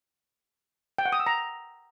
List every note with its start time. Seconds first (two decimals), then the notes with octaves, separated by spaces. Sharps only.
0.98 G5
1.05 F#5
1.12 D#6
1.20 E6
1.27 A#5